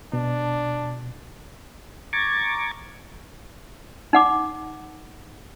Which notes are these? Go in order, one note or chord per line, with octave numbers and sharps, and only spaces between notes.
B2 D4
A#5 C#6 D6 G#6 A6
D#4 F#5 D6